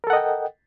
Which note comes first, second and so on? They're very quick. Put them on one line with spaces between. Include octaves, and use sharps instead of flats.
A#4 A4 F#5 D#5 G5